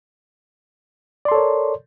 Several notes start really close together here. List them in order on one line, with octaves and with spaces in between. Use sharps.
D5 C6 A4 C#5 A#4